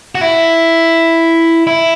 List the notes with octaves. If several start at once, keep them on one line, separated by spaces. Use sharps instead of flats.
F#4
E4
E4